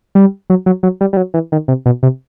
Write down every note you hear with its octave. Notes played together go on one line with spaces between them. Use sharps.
G3
F#3
F#3
F#3
G3
G3
F#3
E3
D#3
C3
B2
C3